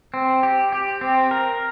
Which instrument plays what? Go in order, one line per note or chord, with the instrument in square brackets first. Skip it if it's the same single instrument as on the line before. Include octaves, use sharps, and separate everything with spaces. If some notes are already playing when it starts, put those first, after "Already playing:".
[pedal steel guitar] C4
G4
G4
C4
A#4